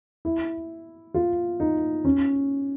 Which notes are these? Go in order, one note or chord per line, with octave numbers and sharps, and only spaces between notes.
E4
F4
D#4
C#4